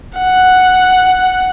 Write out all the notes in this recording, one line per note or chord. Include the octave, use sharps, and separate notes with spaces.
F#5